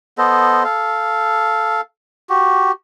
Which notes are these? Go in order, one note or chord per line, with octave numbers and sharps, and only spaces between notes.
B3 A4 C5 D#5
A4 F5
F#4 G4